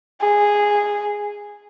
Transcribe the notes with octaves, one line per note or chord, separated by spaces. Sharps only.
G#4